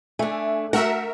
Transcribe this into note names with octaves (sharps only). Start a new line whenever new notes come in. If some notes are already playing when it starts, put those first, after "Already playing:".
A3 D4 E5 G#5
A3 F#4 A#4 E5 F#5